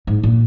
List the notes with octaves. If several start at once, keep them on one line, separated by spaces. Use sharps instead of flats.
G#2
A#2